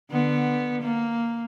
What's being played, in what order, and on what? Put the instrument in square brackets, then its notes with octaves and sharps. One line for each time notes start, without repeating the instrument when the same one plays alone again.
[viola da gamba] D3 B3
A#3